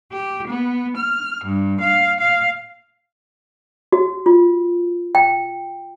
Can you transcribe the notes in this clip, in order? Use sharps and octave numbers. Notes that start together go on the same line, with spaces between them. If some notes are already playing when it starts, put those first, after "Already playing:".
G4
B3
F6
G2
F5
F5
F#4
F4
G5